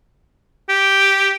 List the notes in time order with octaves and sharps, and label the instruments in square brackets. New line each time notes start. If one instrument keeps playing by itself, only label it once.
[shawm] G4